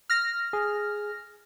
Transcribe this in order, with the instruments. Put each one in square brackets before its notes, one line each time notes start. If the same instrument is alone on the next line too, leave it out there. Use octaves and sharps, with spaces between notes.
[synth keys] F6 A#6
[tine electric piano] G#4